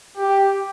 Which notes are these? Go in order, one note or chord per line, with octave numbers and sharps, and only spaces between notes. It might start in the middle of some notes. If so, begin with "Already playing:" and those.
G4